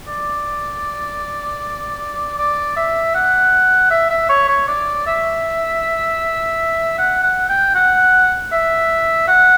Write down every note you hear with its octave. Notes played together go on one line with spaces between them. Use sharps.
D5
D5
E5
F#5
E5
E5
C#5
C#5
D5
E5
F#5
F#5
G5
F#5
E5
F#5